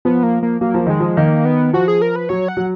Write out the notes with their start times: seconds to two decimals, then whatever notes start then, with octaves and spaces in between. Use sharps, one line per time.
0.05 F3 B3
0.23 A#3
0.43 A#3
0.61 F#3 A#3
0.74 F3
0.87 D#3 G#3
1.00 F3
1.17 D#3 A#3
1.45 B3
1.73 F3 F#4
1.88 G#4
2.02 A#4
2.16 B4
2.29 F#3 C#5
2.48 F#5
2.57 F#3